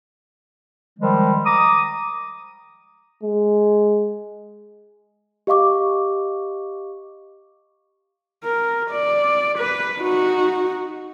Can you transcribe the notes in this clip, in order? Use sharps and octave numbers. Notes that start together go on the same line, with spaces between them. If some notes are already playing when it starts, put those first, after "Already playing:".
D#3 F3 G3 G#3
A#5 D6 D#6
G#3
G4 D#5 F5 C#6 D6
A#4
D5
B4
D#4 F#4